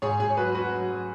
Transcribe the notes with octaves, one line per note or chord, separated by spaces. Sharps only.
G#2 G#4 C#5
G#2 G#4
C#5
F#3 F#4 B4
C#4 F#4 B4
F#3
F#3